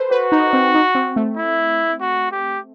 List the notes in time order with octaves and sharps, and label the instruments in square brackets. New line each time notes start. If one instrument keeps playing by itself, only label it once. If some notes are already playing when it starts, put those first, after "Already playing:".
Already playing: [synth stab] A4 B4 C5
[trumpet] F#4 [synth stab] B4
[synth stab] D#4
C4
D#4
C4
A3
[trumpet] E4
F#4
G4